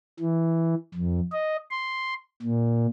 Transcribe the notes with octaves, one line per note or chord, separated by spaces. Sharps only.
E3
F2
D#5
C6
A#2